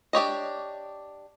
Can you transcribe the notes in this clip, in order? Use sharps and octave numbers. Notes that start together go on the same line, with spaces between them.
D4 G4 C#5 D#5